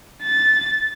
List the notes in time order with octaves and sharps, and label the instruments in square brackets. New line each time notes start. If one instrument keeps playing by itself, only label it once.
[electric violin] A6